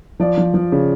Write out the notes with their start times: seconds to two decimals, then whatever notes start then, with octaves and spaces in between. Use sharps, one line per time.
0.20 F3 D5
0.37 F3
0.54 F3
0.72 C#3